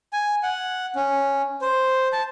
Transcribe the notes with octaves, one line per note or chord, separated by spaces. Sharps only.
G#5
F#5
C#4
C5
A5